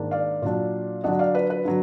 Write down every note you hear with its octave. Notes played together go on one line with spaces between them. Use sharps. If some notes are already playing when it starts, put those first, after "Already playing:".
Already playing: G#2 D#3 A#3 D4
D5 F5
A#2 F#3 D4
D3 F#3 D4 D#5 F#5
D5 F5
B4
B4
D3 F#3